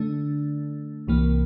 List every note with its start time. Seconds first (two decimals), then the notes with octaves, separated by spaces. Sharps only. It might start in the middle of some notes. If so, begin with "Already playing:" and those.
Already playing: D3 A3 D4
1.07 C2 C3 E3 A#3